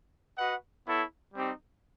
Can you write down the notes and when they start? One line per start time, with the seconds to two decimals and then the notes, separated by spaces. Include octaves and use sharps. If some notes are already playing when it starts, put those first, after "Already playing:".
0.37 F#4 B4 D#5 F#5
0.86 B3 E4 A4 C#5
1.33 G3 C4 D#4 G4